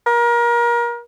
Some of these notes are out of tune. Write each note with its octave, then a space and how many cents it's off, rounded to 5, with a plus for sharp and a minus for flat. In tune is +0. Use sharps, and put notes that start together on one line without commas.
A#4 +30